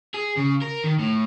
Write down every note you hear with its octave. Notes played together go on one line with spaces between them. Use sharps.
G#4
C#3
A#4
D#3
A2